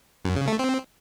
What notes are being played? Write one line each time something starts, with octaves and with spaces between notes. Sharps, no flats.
F#2
C#3
A3
C4